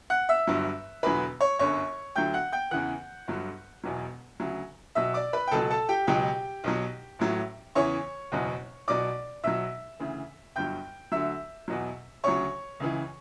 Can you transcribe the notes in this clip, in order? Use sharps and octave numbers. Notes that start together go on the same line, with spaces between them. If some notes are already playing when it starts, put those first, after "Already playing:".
F#5 F#6
E5 E6
G1 G2 F#3
E1 E2 D3 F#3 B4 B5
C#5 C#6
G1 F#2 D3 C#5 C#6
D2 D3 F#3 G5 G6
F#5 F#6
G5 G6
E2 C#3 E3 F#5 F#6
G1 G2 D3 F#3
E1 E2 B2 F#3
D2 C#3 F#3
B1 B2 F#3 E5 E6
D5 D6
B4 B5
G5
C#2 B2 F#3 A4 A5
A4 A5
G4 G5
C#2 B2 F#3 G4 G5
B1 B2 F#3
A1 A2 F#3
E2 C#3 E3 C#5 C#6
F#1 E2 B2 F#3
B1 B2 F#3 D5 D6
B1 B2 F#3 E5 E6
D2 C#3 E3
G1 G2 F#3 G5 G6
D2 D3 F#3 E5 E6
E2 B2 F#3
D2 C#3 F#3 C#5 C#6
C#2 C#3 E3